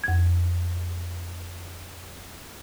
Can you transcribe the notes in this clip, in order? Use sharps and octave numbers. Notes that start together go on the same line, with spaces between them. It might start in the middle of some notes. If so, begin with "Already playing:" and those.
F2 G#6